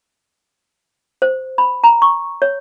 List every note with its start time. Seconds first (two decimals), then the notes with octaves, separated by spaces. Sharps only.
1.22 C5
1.58 B5
1.84 A#5
2.02 C#6
2.42 C#5